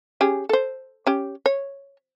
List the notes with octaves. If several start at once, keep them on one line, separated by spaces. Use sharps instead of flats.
C#4 G4 G#4
A4 C5
C#4 G4
C#5